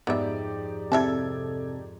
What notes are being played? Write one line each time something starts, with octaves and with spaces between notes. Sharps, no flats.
F2 G#2 B3 D#4 G4 D5 E5
C3 E4 A4 E5 A5 G#6